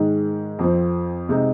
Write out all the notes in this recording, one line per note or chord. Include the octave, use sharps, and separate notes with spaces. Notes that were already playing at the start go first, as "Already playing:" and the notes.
Already playing: G#2 D#3 G#3
F2 F3 C4
C3 G#3 D#4